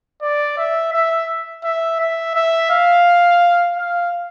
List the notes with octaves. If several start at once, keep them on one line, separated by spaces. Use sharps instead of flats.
D5
E5
E5
E5
E5
E5
F5
F5